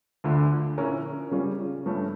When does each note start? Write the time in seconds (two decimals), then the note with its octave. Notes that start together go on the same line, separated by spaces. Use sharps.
0.24 D2 D3 A3 D4 F4
0.78 A#2 F3 C#4 E4 A#4
1.31 C#3 G3 C#4 F4
1.86 G2 F3 A3 C#4